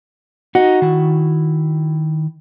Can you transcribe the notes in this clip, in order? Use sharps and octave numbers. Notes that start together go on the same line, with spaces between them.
D#4 F#4 D#5
D#3 E4